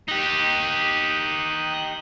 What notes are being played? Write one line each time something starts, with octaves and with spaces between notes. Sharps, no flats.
D#4 G4 D#6 F#6 G6